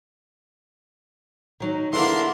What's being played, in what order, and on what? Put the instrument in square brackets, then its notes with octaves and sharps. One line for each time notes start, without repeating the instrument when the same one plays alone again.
[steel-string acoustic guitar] D#3 F#3 D#4
[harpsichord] E2 D3 A#3 [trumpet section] D4 A#4 C6 [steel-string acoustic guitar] E4